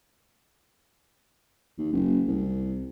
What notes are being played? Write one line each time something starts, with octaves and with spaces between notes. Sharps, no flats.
D#2
F#1
C2